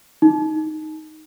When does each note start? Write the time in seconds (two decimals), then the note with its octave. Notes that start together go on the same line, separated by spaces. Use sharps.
0.22 D#4